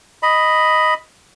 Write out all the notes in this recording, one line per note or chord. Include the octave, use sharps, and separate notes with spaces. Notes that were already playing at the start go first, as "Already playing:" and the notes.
D#5 B5